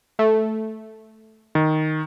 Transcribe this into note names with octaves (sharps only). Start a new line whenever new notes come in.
A3
D#3